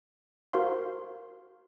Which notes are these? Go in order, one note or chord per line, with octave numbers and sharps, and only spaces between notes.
F#4 A#4 C5 F5 C6